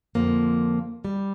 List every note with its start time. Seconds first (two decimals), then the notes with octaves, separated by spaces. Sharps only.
0.15 F2 D3 F3 A#3
1.05 G3